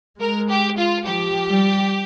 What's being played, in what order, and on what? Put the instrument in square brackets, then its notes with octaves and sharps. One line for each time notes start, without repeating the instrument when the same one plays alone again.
[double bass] G#3 [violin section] A#4
[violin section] G4
F4
[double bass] F3 [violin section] G4
[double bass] G3